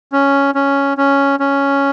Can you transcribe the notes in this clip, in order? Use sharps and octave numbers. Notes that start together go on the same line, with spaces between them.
C#4
C#4
C#4
C#4